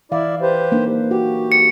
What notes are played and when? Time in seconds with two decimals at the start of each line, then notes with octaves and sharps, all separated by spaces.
0.12 E3 E4 D5 F5
0.42 G4 B4 C5
0.72 A#3 D4 D#4
1.11 F#4 G4
1.52 C#7